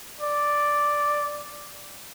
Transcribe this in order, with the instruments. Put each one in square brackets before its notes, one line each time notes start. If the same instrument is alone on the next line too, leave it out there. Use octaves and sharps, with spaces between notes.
[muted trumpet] D5